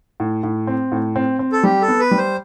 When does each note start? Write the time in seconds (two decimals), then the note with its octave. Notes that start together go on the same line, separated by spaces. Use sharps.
0.20 A2
0.43 A2
0.67 C4
0.92 A2
1.16 C4
1.39 C4
1.52 A4
1.63 G3 G4
1.82 A4
1.88 B3
2.00 B4
2.11 G3
2.18 C5